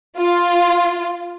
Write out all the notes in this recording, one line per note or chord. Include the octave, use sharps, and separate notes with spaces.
F4